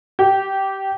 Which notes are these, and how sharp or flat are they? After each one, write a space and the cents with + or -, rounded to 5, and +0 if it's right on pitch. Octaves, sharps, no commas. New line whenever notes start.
G4 -15